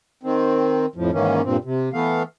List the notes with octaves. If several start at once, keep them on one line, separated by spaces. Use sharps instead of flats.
D#3 C4
F2 A2 F3
G#2 D#3 E3 A#3 C#4
G2 A#2 C4
C3
E3 A3 B3 F5